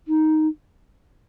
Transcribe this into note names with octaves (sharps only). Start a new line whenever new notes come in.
D#4